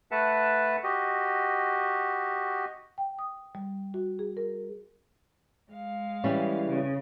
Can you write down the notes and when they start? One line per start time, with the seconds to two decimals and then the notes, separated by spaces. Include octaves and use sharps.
0.11 A3 B4 E5 F#5 A5
0.84 F#4 G4 D#5
2.98 G5
3.19 D#6
3.55 G3
3.94 F#4
4.19 G#4
4.37 A#4
5.72 G#3 F5
6.24 E3 G3 C#4
6.68 C#3